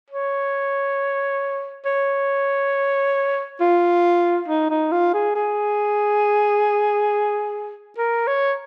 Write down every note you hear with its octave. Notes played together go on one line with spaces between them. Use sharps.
C#5
C#5
F4
D#4
D#4
F4
G#4
G#4
A#4
C#5